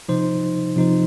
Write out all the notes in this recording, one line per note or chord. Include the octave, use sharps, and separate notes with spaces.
C3 F3 D#4 C5
C3 F3 D#4 C5